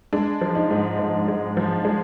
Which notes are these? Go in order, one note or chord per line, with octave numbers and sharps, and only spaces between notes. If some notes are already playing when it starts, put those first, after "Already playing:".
G#3 D4
F3
D#4
G#2
G#2
G#3
F3
G#3